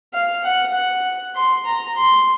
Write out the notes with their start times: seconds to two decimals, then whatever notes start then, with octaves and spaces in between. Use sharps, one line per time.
0.14 F5
0.44 F#5
0.74 F#5
1.35 C6
1.66 A#5
1.96 C6